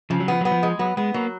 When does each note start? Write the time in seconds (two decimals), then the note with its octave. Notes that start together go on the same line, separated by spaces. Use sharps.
0.10 C#3 F3
0.20 F#3
0.28 F3 B3
0.41 F#3 B3
0.51 F3
0.63 G#3
0.79 F#3 B3
0.97 G#3 B3
1.14 F#3 A#3